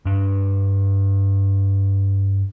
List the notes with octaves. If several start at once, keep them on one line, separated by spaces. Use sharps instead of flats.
G2 D4